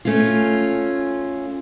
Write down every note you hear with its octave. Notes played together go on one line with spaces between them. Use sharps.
A3 C#4 F4